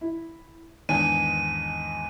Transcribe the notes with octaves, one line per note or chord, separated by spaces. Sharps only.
E4
E2 G#2 D#3 D4 G#5 D#7